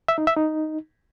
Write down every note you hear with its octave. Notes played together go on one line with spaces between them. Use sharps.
E5
D#4
E5
D#4